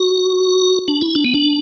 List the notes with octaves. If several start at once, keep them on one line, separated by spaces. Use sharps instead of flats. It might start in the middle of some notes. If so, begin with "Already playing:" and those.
Already playing: F#4
D4
E4
D4
B3
D4